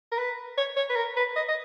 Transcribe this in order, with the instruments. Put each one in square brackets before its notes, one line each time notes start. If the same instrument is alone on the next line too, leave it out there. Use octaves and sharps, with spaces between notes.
[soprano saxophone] A#4
B4
C#5
C#5
B4
A#4
B4
D#5
D#5